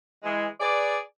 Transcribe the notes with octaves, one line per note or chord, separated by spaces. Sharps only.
E3 G#3
G#4 B4 D5